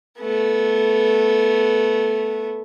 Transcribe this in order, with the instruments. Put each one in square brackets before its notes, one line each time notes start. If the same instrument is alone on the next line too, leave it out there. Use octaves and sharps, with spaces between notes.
[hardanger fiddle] A3 B3